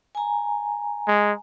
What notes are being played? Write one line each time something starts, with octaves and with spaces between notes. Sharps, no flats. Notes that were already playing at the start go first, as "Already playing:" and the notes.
G#5 A#5
G#3